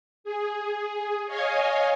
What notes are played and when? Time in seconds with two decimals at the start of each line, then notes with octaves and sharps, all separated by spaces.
0.24 G#4
1.27 C#5 D#5 F5 G#5